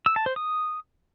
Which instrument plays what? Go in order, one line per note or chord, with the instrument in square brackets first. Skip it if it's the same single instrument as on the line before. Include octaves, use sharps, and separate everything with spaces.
[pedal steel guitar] E6
A5
C5
D#6